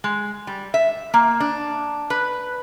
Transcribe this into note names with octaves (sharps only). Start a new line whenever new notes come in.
G#3
G3
E5
A#3
D4
B4